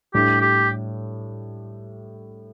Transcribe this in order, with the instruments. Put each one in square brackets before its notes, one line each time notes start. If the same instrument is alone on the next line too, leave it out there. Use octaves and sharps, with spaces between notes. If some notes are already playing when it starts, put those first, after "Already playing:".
[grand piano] A2 G3 D4 [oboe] G4
[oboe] G4